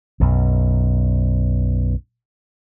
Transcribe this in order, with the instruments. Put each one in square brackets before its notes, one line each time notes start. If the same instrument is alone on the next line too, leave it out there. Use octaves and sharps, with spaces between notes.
[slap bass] B1 F#2